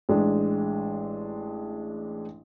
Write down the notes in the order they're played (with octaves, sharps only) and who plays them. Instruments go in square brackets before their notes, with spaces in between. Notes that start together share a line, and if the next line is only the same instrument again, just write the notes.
[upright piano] A1 G#3 D4